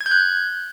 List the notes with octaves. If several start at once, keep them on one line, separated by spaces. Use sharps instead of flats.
G#6
G6
F#6